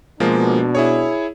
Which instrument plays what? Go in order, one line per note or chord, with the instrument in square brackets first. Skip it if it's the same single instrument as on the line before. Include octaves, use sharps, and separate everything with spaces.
[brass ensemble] B2 D4 [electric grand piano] F3 G#3 A#3
[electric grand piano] E4 G#4 C#5